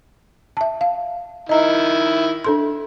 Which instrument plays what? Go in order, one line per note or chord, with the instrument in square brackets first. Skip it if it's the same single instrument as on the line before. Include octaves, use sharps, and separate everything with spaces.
[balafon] E5 A5
F5
[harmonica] D#3 E4 [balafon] D#5 A#5
[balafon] D4 A4 C6